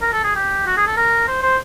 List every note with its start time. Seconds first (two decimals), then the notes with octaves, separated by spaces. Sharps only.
0.01 A#4
0.13 A4
0.24 G#4
0.36 G4
0.67 F#4
0.77 G#4
0.87 A4
0.97 A#4
1.28 C5
1.43 C5